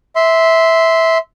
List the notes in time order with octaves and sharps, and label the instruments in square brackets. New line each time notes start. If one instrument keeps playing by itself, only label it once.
[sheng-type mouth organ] E5 C6